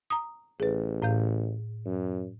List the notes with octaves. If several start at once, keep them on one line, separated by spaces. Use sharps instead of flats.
A#5 D#6
A1 G#4 B4
A2 F5 G6
F#2